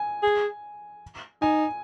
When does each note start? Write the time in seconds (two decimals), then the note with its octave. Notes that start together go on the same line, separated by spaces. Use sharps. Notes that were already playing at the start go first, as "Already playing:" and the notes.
Already playing: G#5
0.23 G#4
1.42 D#4 G#5